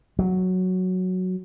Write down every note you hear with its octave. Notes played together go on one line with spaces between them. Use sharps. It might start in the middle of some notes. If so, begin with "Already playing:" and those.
F#3